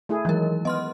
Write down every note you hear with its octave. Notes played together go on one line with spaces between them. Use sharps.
A3 E4 G#4
D#3 E3 F#3 G#3 A#4
B3 D#5 C6 F6